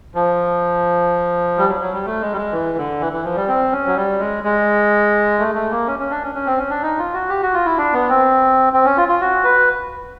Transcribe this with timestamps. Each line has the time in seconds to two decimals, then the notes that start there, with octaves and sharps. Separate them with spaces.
0.15 F3
1.58 G3
1.69 F#3
1.81 F#3
1.93 G3
2.06 A3
2.21 G#3
2.32 G3
2.37 G#3
2.52 E3
2.77 D3
3.00 E3
3.13 E3
3.24 F3
3.36 G3
3.48 C4
3.72 C#4
3.87 F#3
3.96 G3
4.19 G#3
4.44 G#3
5.39 A3
5.55 A3
5.71 A#3
5.87 C#4
5.99 C#4
6.10 D4
6.23 C#4
6.35 C#4
6.46 C4
6.58 C#4
6.70 D4
6.83 D#4
6.99 F4
7.14 F#4
7.29 G4
7.42 F#4
7.54 F4
7.65 E4
7.78 D4
7.93 B3
8.09 C4
8.73 C4
8.85 C#4
8.97 F4
9.08 F4
9.21 F#4
9.44 B4